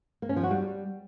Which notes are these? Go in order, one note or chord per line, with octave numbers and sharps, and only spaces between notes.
A#3
C#4
F3
F#4
G3